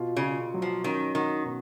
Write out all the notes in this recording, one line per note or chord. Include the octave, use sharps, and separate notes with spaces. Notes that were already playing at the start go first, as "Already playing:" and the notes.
Already playing: B2 F4
C#3
F4
F#3
F3
D#3 C#4
D#3 F#4
B2